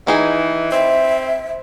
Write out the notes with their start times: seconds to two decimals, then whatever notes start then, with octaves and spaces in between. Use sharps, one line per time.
0.07 D#3 E3 D#4 G#4
0.72 C4 E5